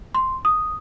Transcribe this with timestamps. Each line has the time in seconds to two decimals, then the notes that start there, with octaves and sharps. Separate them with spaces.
0.15 C6
0.45 D#6